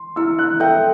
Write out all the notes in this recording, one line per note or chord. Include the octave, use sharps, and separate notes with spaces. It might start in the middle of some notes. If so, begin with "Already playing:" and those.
Already playing: C6
E4 E6
F#6
A4 E5 G5 G6